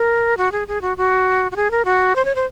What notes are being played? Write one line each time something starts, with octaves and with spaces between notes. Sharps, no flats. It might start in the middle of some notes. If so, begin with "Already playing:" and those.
Already playing: A#4
F#4
G#4
G#4
F#4
F#4
F#4
G#4
A#4
F#4
C5
C#5
C5